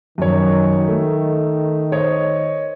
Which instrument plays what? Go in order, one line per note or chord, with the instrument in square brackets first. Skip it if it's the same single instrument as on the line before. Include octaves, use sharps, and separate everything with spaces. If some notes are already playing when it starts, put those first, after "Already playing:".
[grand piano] F#2 C#5 [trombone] D#3
[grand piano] A3
C5 C#5 D#5